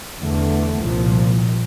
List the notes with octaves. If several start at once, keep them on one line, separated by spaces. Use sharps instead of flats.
E2 D3 A3
C2 A#2 F3